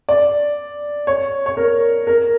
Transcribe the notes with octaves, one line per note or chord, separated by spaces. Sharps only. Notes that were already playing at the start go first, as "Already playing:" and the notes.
D5
C#5
C#5
A#4
A#4